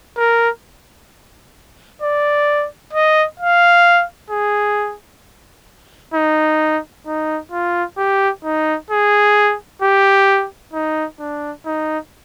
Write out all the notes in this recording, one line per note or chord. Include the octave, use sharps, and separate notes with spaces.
A#4
D5
D#5
F5
G#4
D#4
D#4
F4
G4
D#4
G#4
G4
D#4
D4
D#4